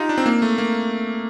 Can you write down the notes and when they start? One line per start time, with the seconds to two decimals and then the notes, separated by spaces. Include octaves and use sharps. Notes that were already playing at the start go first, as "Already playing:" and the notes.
Already playing: D#4 F4 G4
0.09 D4
0.18 C4
0.26 A#3
0.42 A3
0.58 A#3